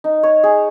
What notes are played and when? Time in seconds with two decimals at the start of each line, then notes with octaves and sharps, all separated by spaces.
0.04 D#4
0.23 C#5
0.43 G#4